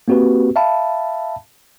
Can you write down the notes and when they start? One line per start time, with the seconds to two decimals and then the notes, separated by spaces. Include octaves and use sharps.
0.08 A#3 C4 F#4 G4 B4
0.56 E5 F5 A5 B5